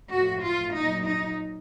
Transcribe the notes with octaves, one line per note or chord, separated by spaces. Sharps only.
A2 F3 F#4
F4
A#2 F#3 D#4
D#4